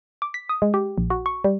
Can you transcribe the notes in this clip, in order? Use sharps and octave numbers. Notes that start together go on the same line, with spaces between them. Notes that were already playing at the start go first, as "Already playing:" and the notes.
D6
B6
D#6
G#3
G4
A#1
F#4
C#6
G3